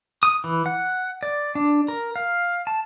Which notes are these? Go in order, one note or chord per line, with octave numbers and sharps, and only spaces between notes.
D#6
E3
F#5
D5
D4
A#4
F5
A5